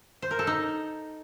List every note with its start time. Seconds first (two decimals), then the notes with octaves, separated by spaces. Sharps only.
0.22 C5
0.31 A#4
0.39 A4
0.47 D#4